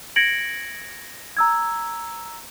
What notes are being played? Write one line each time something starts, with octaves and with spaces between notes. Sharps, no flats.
G#6 A#6 C#7 D7 F#7
A#5 E6 G#6